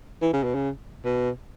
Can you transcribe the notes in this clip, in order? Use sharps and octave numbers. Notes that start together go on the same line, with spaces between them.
E3
C#3
B2
C#3
B2